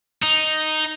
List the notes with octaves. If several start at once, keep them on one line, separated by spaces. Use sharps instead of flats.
D#4